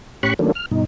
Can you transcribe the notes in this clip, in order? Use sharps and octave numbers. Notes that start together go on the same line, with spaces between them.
A2 C#4 G4 B5 C#6 F#6
D#3 F#3 A3 A#3 C#4 D4
F6
G2 B2 D#4